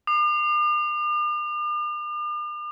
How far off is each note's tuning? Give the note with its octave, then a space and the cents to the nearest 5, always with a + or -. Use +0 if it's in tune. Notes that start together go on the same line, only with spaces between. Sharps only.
D6 +45